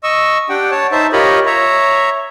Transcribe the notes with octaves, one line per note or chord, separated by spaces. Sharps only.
D#5 C#6 E6
D4 G4 F#5 G5
C#5 A5
D#4 C5 E5 A5
F4 G4 A#4 C#5 D#5 B5
C#5 E5 A#5